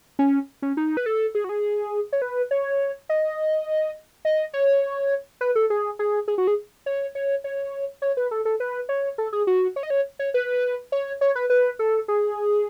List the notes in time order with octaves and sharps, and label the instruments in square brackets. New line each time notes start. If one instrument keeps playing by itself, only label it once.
[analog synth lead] C#4
C#4
D#4
B4
A4
G#4
F#4
G#4
C#5
B4
C#5
D#5
D#5
C#5
B4
A4
G#4
G#4
G#4
F#4
G#4
C#5
C#5
C#5
C#5
B4
A4
A4
B4
C#5
A4
G#4
F#4
C#5
D#5
C#5
C#5
B4
C#5
C#5
B4
B4
A4
G#4